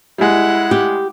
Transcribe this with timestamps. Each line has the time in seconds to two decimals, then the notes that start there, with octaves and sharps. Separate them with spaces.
0.18 G3 G#3 E4 F#5
0.71 G4